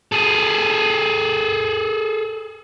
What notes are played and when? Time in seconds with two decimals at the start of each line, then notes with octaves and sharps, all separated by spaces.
0.12 G#4 A4